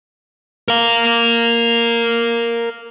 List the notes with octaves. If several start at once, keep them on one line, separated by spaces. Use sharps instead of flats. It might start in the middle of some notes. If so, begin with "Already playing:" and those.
A#4 F5